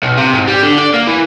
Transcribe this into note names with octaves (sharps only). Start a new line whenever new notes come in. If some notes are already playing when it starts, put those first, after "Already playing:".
B1
C3
G#2
G3
D3
D5
A#3
E3